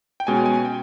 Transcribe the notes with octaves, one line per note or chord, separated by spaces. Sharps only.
G5
B2 G#3 C#4 G#5
G#5
G5